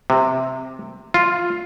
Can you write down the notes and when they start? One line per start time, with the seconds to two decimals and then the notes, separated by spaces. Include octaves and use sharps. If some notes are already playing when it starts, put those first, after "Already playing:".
0.10 C3
1.14 F4